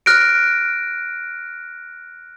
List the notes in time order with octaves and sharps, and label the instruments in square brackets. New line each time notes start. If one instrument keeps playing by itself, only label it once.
[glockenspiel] F6 F#6 A#6 D7